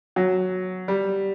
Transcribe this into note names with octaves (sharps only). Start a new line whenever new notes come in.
F#3
G3